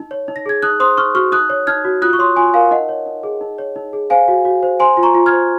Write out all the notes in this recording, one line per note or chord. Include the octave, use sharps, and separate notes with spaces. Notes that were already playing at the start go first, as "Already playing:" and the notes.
Already playing: D#4
C#5
D#4
A#6
G#4 G#6
D#4 D#6 F#6
C5 C6 D#6
D#4 C#6 F6
F#4 C#6 F6
D#4 D#6 F#6
C#5
D#4 F6 G#6
F#4
F4 D#6 F#6
C#6
C#5 C6 D#6
F4 G#5 C6
A#4 F5 G#5
D#4 D#5 F#5
C#5
D#4
G#4
D#4
C#5
D#4
G#4
C5 F5 G#5
F#4
F#4
C5
C5 G#5 C6
F4
A#5 C#6
F4
F6 G#6
C5